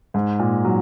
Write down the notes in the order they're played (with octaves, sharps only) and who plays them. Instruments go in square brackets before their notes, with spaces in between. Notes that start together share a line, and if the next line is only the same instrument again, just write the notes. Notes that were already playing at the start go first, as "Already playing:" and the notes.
[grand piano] G#2
A#2
F#3